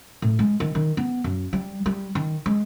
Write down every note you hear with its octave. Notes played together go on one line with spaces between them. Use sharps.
A2
G#3
D#3
D#3
B3
F#2
G3
G3
D#3
G#3